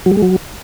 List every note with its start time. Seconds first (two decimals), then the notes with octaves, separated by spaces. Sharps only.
0.06 F#3
0.11 G3
0.17 G#3
0.22 F#3